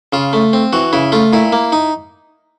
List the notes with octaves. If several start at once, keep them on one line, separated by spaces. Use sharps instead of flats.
C#3 F4
A3
C4
E3 F#4
C#3 E4
A3 F4
A#2 E4
A#3
D#4